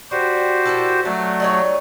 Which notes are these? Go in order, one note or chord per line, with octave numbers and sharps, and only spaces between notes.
G3 F#4 G4 C5
A#2 E4 A4
F#3 A3 D4
G3 D#4 C#5